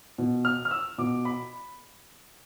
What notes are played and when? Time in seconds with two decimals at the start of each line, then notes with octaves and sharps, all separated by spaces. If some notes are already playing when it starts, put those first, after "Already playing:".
0.18 B2
0.45 F6
0.65 F6
0.71 E6
0.98 B2 D6
1.25 B5